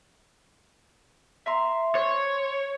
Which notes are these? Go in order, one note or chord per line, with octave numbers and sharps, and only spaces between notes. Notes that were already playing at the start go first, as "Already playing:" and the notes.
E5 A#5 C6
C5 C#5